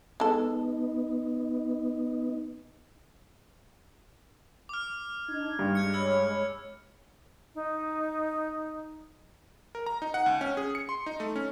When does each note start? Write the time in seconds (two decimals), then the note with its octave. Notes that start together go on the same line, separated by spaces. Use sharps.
0.20 G#3 B3 D#4 A4
4.69 D6 F6
5.28 D4 D#4 G#6
5.59 G2
5.75 G#3 F#6 G#6 C#7
5.94 C#5 B5 E6 G#6
7.55 D#4
9.75 A#4
9.86 A#5
10.02 D#4
10.14 F#5
10.26 C#2
10.41 C#4
10.57 G#4
10.75 C#7
10.89 C6
11.06 D#4
11.20 A3
11.36 C#4